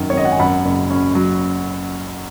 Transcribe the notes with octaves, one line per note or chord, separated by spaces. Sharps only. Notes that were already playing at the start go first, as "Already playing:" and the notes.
Already playing: G#1 F#2 D#3
C#5
G#1 D#5
F#5
G#5
F#2 F#5 B5
F#1
C#4
F#3